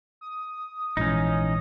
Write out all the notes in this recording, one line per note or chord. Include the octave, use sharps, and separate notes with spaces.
D#6
A#1 G#2 E3 C#4 D#4